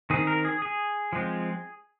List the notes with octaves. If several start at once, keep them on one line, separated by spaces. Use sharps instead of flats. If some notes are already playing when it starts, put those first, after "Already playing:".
D#3 C4 G#4
A#4
G#4
G#4
F3 G#3 C4